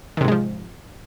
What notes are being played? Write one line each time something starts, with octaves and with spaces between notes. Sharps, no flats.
G#2 C3 D#3 F3 G#3